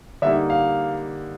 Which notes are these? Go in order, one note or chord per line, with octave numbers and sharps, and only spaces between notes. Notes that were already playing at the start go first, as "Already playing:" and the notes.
D3 G3 A#3 D#4 E5
F5